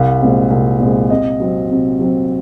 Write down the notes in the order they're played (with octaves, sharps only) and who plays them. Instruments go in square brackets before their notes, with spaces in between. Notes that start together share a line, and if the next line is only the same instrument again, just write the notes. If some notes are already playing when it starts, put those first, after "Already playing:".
Already playing: [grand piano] C2 F5
A#2 G#3 C4
C2
A#2 G#3 C4
C3 D#5
F#3 C4
C3
F#3 C4